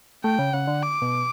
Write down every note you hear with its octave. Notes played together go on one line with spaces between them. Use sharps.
A3 G5
C#3
C#3 F#5
D3
D6
B2